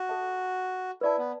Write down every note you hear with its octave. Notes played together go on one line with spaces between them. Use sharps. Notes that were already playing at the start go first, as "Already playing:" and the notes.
Already playing: F#4
A4 E5 A5
E4 B4 D5 A5
B3